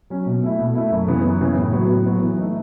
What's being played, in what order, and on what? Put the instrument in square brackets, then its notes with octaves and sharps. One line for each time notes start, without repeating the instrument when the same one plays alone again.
[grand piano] F#3 C#4
B2
A3 E4
B2
A3 E4
F#2
C#3 E3 B3
F#2
C#3 E3 B3
A2
F#3 B3 F#4
A2
F#3 B3 F#4
E3
A3 D#4